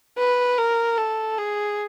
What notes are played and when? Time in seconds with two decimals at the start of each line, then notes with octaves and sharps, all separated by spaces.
0.17 B4
0.58 A#4
0.97 A4
1.38 G#4